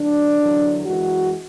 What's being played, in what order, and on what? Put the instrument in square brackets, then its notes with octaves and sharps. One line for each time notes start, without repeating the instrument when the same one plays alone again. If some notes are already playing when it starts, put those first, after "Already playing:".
Already playing: [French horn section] D2 D3 F#3 D4
E2 D3 F#3
F#2 E3 G#3 F#4